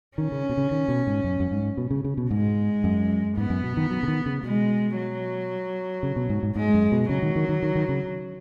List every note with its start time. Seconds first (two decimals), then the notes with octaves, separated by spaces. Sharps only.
0.18 D#3 C#4
0.32 C#3
0.49 B2
0.57 C#3
0.71 D#3
0.88 B2
1.07 G#2
1.24 F#2
1.40 F#2
1.51 G#2
1.78 B2
1.91 C#3
2.04 C#3
2.17 B2
2.31 G#2 G#3
2.84 F#2
3.37 G#2 B3
3.50 F#2
3.64 B2
3.77 D#3
3.91 F#3
4.03 C#3
4.08 D#3
4.26 C#3
4.43 B2 G#3
4.97 F#3
6.03 C#3
6.16 B2
6.29 G#2
6.43 G#2
6.56 G#2 G#3
6.74 F#2
6.92 B2
7.09 C#3 F#3
7.23 D#3
7.36 D#3
7.49 D#3
7.63 D#3
7.75 D#3
7.89 C#3